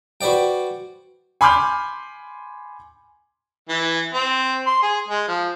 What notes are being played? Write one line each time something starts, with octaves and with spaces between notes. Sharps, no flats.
F#4 B4 C5 D5 G5
G#5 B5 C6 D6 F6 G6
E3
C4
C6
G#4
G#3
F3